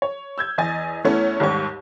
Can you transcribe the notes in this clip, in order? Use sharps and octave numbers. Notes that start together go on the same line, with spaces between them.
C#5
E6 G6 G#6
E2 D#5 G#5 A6
E2 E3 A3 B3 C#4
D#2 G#2 G3 C#5 C#6